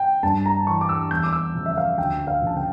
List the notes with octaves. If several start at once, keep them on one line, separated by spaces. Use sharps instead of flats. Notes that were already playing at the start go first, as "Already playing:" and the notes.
Already playing: G5
G2 A5
A#5
E3 C#6
D6
E6
E2 G6
D6
E6
C#3 F3
E5
F5
D2 G5
F5
C#3 F3 A5
G5